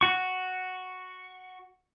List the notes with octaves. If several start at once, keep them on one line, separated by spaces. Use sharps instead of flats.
F#4 C#6